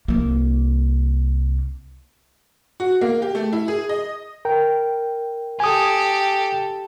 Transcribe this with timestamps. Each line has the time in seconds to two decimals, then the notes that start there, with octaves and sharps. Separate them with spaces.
0.08 C2 A#3
2.80 F#4
3.01 A#3
3.22 G4
3.35 A3
3.53 E4
3.68 G#4
3.89 D#5
4.45 A#4 G5
5.60 G4 A4 G#5 D#6